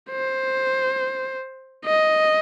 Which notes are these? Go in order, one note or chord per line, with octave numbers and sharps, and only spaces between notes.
C5
D#5